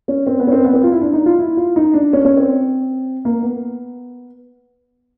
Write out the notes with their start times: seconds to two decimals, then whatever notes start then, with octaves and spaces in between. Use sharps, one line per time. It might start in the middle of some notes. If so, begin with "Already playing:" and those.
0.08 C#4
0.27 C4
0.40 B3
0.47 C#4
0.52 C4
0.65 B3
0.73 C4
0.83 F4
0.92 E4
1.01 D4
1.13 D#4
1.26 F4
1.39 E4
1.57 F4
1.76 D#4
1.94 D4
2.13 C#4
2.25 C#4
2.37 C4
3.25 A#3
3.42 B3